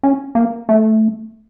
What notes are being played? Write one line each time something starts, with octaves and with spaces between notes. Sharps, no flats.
C#4
A#3
A3